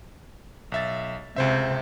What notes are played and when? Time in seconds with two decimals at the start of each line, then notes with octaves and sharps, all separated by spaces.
0.72 B1 E5 A6
1.36 C#2 C3 C5 E5